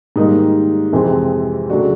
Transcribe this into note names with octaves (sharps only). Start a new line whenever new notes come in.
G#2 D#3 G3 A#3 D#4
F2 C3 E3 G#3 C4
C#3 F#3 A3 D4 F#4